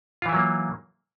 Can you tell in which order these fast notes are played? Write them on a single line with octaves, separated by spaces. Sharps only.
F4 E3 E4 F#3 A#3